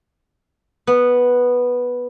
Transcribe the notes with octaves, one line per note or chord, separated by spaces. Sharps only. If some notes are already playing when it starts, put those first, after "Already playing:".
B3